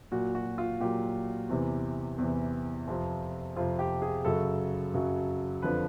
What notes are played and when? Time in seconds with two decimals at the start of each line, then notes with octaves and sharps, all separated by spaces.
0.12 A#2 F#3 F#4
0.35 F#4
0.58 F4
0.80 A#2 F#3 G4
1.49 E2 C3 E3
2.18 E2 C3 E3
2.87 F2 C3 F3
3.56 F2 C3 F3 F4
3.79 G4
4.02 G#4
4.25 F#2 C#3 F#3 A4
4.94 F#2 C#3 F#3
5.62 F2 D3 F3 B4